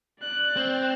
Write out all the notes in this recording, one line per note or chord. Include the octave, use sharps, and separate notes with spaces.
D5 F#6
C4